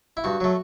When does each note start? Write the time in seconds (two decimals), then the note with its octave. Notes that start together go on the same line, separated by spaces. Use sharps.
0.17 E4
0.24 G2 F#4
0.40 F#3 A3